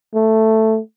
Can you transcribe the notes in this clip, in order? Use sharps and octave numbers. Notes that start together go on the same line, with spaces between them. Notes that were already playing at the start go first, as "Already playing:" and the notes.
A3